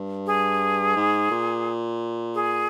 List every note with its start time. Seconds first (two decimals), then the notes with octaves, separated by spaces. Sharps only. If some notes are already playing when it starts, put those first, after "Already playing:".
Already playing: G2
0.27 G#4
0.96 G#2
1.31 A#2
2.35 G#4